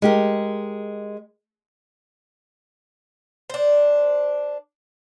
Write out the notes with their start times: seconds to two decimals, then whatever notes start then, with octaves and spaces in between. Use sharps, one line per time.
0.02 G#3 G4 A#4
3.50 D4 C5